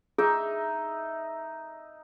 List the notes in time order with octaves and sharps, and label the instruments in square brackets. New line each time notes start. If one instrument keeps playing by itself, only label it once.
[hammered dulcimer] D#4 E5 [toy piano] G#4